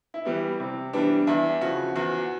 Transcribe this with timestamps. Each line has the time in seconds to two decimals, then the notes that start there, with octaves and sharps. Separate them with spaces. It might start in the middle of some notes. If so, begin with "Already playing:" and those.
0.14 E4
0.25 E3 G3 B3
0.60 C3
0.93 E3 G3 B3 D4
1.27 E2 E4
1.61 C#3 F3 F#4
1.96 E2 F#4